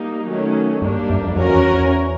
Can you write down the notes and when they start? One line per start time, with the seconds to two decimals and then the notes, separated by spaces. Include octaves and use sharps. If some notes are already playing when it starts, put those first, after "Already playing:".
Already playing: G3 A#3 D#4
0.26 D#3 F#3 A3 C#4
0.82 G2 G3 A#3 D4
1.10 F#2
1.22 F2
1.36 F2 C#4 F#4 A#4
1.49 E2
1.74 E2